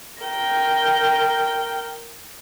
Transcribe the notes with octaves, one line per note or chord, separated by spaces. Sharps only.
A#4 G5